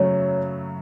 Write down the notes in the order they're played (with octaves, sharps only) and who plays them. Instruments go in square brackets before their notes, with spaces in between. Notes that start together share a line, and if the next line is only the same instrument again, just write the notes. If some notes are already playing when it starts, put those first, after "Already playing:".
Already playing: [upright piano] F#2 C#3 F#3 A3 [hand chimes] C#5